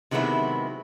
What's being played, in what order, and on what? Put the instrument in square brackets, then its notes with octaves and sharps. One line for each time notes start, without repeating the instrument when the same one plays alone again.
[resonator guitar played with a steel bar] C3 D#3 F#3 G#3 B3 E4